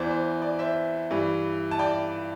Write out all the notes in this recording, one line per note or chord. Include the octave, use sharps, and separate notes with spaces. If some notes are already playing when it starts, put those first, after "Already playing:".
Already playing: E2 E3 C5 D5
C5
D5
C5 E5
G2 E3
A5
D5 G5